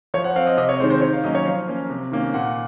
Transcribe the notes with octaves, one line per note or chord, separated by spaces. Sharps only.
F3 C#5
F#5
C4 F5
D#5
C3 D#5
C#5
D#3 G#3 C4 C5
C5
D#3 C#5
F5
F#3 A#3 C#4 D#5
C#5
F3 F5
A#3 C#4
C3
D#3 A#3 C#4
A#2 F#5